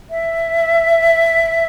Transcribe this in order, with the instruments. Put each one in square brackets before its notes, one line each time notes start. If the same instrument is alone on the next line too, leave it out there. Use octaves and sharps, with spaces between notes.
[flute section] E5